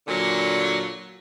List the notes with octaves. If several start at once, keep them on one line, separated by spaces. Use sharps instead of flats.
A#2 D3 F#3